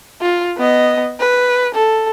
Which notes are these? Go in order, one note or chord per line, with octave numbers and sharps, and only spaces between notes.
F4
B3 D#5
B4
A4